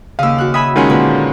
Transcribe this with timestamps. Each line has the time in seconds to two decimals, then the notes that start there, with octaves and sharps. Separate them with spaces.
0.19 D#2 C#3 F5 E6
0.38 F#4 F#6
0.54 E5 G#5 B5 D#6
0.76 D#3 G#3 C#4 F4 F#5 G#5
0.89 A#2 D3 B4